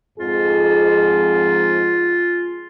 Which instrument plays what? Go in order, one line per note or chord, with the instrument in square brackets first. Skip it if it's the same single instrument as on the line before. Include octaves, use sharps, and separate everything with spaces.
[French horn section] F2 G#2 G#4 [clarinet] F4